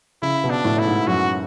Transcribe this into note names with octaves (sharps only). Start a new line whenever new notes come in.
C#3 E4
B2
D4
A2
A2 E4
G#2
F#2 F#4